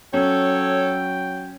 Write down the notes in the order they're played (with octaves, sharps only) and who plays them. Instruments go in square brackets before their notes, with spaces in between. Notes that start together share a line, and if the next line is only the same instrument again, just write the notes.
[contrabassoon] F#3 [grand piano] C#4 [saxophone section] A4 C#5 [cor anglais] G5